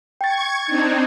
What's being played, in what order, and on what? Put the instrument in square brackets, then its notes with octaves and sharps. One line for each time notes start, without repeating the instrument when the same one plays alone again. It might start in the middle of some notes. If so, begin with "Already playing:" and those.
[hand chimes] G5 A6 [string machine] C#6 G#6
[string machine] C4 D4 D#4 [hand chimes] G#6